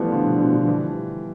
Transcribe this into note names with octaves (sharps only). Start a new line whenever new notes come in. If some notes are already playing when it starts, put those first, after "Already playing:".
Already playing: E3 F3 G3 A3 B3
D3 F3
B2 D3
B2 D3
B2 D3
F3
E3 G3